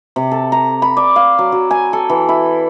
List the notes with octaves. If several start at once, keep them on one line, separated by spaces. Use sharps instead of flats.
C3
A4
A#5
B5
D5
F5
F#3
F#3
G#5
A4
E3
E4